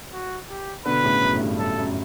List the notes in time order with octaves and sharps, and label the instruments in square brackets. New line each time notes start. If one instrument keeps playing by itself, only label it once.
[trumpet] F#4
G4
[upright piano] B2 D3 [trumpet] B4
[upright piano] A2 C#3
F#2
A2
G2
[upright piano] F#2 [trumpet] A4
[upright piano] F#2